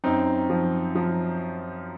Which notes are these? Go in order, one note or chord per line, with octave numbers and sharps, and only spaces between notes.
F#2 C4 D#4
F3
F3